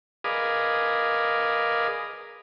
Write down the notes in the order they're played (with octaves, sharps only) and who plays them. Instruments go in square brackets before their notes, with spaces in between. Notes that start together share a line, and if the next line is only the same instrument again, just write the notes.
[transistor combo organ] G#4 A#4 B4 D5 D#5 F5